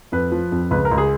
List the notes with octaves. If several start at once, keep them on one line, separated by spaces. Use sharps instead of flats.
F2 B4
F3
F2
C#2 B4
A#4
C#2
G#4